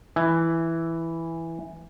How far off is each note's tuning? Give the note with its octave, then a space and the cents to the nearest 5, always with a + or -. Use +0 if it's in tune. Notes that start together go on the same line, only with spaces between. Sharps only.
E3 +0 G#5 -5